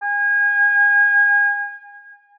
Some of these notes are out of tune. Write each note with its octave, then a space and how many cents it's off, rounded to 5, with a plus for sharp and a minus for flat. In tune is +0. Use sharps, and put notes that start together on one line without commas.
G#5 -30